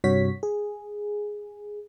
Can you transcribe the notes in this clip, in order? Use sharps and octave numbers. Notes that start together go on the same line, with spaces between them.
G2 C3 F#4 C#5 B6
G#4